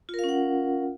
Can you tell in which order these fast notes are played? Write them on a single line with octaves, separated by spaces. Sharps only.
F4 A#4 F5 C#4 F#5